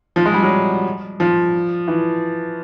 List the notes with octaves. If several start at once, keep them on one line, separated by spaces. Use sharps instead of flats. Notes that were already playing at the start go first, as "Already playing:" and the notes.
F3
G#3
G3
F#3
F3
E3